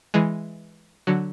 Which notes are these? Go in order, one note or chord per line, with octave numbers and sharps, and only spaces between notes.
E3 G#3
D3 F#3